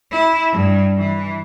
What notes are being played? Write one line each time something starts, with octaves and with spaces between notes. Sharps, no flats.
E4
G2
E3